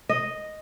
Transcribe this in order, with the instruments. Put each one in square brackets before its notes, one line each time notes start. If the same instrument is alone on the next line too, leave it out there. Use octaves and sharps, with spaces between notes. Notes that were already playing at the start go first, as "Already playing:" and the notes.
[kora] D#5